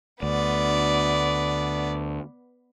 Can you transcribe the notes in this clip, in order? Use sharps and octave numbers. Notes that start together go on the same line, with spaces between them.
D2 B3 D5